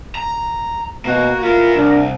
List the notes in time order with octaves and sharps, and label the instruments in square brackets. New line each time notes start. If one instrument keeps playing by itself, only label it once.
[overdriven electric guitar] A#5
[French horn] B2 [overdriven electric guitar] A#3 [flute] F#4
[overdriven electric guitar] B3 E4 [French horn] F4 [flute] A#4
[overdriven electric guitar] C2 [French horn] D4